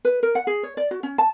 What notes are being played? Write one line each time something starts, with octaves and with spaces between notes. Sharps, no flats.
B4
A#4
F#5
G#4
C#5
D5
F#4
C#4
A5